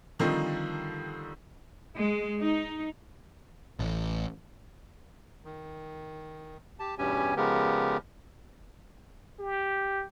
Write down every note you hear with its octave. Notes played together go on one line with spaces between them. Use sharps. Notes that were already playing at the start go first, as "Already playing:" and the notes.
D3 D#3 F3 G3 C4 D#4
G#3
D#4
A1
D#3
G4 A5
E2 G2 B2 C#4 G4 G#5
C#3 F3 G#3 B3 G4 A#4
G4